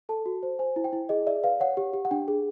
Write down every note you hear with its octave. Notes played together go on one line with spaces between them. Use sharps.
A4 A5
F#4
C5
C5 G#5
E4
G5
E4
G#4 D#5
D5 E5
B4 F5
C#5 F#5
G4
G4
F#5
D4 G5
G#4